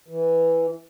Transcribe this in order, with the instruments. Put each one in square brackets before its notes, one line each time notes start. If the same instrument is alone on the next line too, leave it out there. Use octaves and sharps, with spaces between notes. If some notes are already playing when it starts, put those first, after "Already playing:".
[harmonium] E3